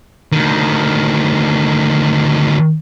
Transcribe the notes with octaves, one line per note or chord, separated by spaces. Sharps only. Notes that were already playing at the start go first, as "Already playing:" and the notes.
D2 D#3